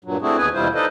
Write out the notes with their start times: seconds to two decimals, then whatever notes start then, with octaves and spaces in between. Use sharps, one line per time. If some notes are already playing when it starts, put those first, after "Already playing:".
0.04 G2 A#2 F#3
0.22 A3 C4 D4 E4 F#4 G#4
0.37 D#2 B3 G#4 B4 G#5
0.54 D#2 B2 G3 E4 F4 C5
0.75 D#4 A4 B4 C5 D5 D#5